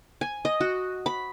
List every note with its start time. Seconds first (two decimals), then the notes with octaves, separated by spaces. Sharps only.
0.21 G#5
0.45 D#5
0.61 F#4
1.06 B5